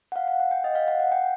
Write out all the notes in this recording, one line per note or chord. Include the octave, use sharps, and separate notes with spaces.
F#5
F5
F#5
F#5
G5
D#5
F5
F#5
F#5
G5